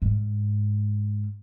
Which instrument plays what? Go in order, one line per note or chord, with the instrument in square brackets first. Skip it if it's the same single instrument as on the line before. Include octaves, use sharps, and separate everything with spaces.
[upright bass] G#2